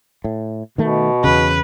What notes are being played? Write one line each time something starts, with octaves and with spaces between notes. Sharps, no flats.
A2
B2 D#3 A3
E2 C#3 B4